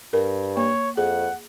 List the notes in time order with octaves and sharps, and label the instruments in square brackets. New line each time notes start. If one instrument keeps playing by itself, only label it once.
[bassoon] G2 [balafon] A#4
[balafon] A#3 [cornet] C#5
[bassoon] F2 [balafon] G#4 [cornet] F#5